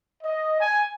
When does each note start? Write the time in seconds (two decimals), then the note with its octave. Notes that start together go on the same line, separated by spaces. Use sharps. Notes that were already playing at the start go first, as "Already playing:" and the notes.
0.22 D#5
0.60 G#5